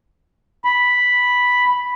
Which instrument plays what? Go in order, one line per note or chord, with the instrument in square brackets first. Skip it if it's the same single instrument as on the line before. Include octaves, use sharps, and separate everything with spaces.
[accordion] B5